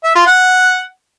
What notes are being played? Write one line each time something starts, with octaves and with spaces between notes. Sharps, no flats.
E5
F4
F#5